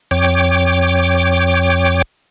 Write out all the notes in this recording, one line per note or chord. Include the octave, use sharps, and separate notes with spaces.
F2 C#5 G5 D6